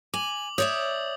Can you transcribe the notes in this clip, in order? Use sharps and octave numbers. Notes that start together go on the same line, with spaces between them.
G#5 D6 F#7
C#5 D5 E5 D#6 G6